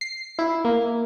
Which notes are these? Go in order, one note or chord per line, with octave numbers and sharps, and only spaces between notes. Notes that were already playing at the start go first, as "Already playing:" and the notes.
C7
E4
A#3